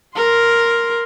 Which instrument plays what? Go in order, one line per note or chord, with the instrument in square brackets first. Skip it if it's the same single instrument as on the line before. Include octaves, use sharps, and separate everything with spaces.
[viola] A#4 C6